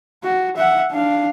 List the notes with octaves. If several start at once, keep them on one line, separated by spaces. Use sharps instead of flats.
F#4
E5 F#5
D4 F5